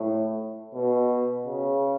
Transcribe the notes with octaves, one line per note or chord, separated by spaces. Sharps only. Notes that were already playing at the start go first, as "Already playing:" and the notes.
Already playing: A2
B2
C#3